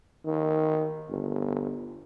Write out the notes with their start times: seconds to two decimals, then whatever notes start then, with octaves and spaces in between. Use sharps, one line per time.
0.25 D#3
1.08 G1